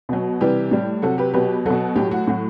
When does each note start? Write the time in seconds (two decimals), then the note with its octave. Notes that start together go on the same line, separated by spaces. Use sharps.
0.09 B2 F#3
0.41 C3 E3 G3 G4
0.71 A2 G3
1.02 C3 F#3 F#4 A4
1.18 G4 B4
1.33 B2 F#3 G4 B4
1.66 B2 F#3 F#4 A4
1.96 A2 F#3 G4
2.11 F#4
2.27 A2 F#3 F#4